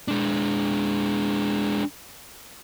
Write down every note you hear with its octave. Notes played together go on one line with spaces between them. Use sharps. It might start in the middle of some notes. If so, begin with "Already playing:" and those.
G#3 D4